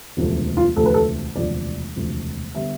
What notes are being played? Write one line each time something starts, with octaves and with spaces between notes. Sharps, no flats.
E1 D2 C3 F3 A3
F4
E1 D2 C3 F3 A3 A4
B4
A4
E1 D2 C3 F3 A3 D5
E1 D2 C3 F3 A3
D3 G3 B3 E5